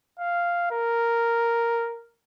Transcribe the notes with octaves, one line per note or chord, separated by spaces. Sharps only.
F5
A#4